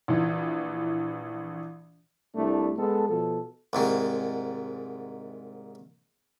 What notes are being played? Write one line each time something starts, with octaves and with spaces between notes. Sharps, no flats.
A#1 E3
C2 A3 D4 E4
G#3 B3 A4
B2 F3 A4
C2 G#2 D#3